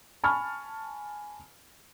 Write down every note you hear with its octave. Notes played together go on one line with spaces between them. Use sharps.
G#5 A5 B5 C#6 F6